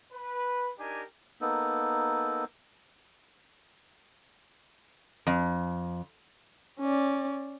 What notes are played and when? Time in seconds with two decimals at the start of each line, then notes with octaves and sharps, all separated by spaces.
0.13 B4
0.79 D4 D#4 G4 A#4 G#5
1.41 A#3 B3 D#4 A4
5.27 F2
6.80 C#4 D5